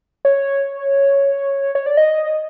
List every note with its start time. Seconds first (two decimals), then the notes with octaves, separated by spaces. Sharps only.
0.25 C#5
1.75 C#5
1.86 D5
1.97 D#5